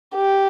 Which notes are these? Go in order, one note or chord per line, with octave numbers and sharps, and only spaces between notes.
G4